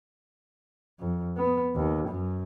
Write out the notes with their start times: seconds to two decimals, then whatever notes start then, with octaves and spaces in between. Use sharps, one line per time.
1.00 F2
1.37 B3
1.75 D#2
2.08 F#2